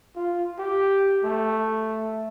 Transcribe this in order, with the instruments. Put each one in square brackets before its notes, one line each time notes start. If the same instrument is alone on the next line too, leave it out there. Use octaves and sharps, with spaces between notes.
[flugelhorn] F4
G4
A3